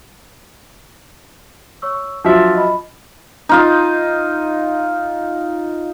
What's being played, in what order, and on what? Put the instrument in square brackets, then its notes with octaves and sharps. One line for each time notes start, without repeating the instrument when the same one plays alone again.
[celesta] C#5 C#6 E6
[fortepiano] F3 F#3 E5 [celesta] D4 C6 A6
[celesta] D#5 B5
[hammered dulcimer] D#4 F4 D#5